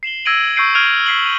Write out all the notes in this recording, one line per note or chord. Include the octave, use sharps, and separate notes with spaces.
C7 E7 F#7 G7
E6 G#6 A#6 D7 D#7 F#7
C#6 E6 G6 C7 D7 D#7
F6 G#6 D7 D#7 F7
E6 B6 C7 D7 F#7
D#7 F7